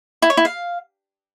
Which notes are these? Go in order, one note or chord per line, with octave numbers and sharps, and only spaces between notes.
E4
C#5
E4
F5